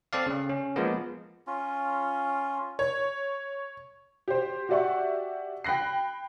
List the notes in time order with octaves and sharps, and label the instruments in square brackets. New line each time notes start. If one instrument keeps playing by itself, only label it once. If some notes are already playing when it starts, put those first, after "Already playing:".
[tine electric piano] C4 A4 D5 F5
C#3
C#4
F3 G#3 A#3 B3
[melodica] C#4 F4
[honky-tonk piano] C#5
G4 C5
F#4 G4 D5 E5 F#5 C#6
G5 B5 F#6 A#6 C7